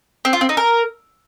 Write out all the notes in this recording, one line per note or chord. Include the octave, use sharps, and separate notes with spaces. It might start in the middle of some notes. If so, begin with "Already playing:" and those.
C4
F4
C4
D#4
A#4